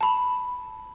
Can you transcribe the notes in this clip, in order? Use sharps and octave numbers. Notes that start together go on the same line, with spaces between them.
A5 B5